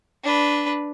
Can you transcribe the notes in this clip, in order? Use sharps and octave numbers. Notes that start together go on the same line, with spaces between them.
D4 B4